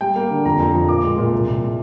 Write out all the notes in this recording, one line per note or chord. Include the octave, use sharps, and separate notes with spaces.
G3 G5
A#3
D3
F2 A#5
F2
F3
A#2 D6
G#3
A#2
C2
C2